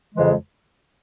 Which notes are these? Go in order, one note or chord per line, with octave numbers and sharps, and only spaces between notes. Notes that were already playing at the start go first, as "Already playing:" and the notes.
F2 C#3 E3 G#3